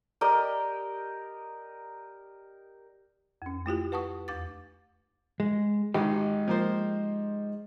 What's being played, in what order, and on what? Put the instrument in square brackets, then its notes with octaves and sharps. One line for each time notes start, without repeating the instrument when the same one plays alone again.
[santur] G4 A#4 D5 D#5
[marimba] F2 C#4
A3 E4 F4 G4
B4 F#5 A5 C#6 D#6
E2 D6 A6
[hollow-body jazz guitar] G#3
[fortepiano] G#1 [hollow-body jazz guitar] G#3 D#4 G4
[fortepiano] F3 A#3 C5